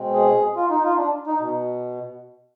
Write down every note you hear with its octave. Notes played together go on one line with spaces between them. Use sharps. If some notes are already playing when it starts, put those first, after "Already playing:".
Already playing: B2 G#3 C4
G#4
F4
D#4
F4
D4
D#4
B2